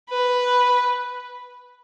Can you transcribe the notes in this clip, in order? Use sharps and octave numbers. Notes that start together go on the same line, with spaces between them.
B4